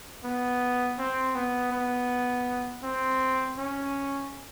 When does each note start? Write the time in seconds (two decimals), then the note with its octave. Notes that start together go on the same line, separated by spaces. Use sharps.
0.24 B3
0.99 C4
1.35 B3
1.72 B3
2.84 C4
3.58 C#4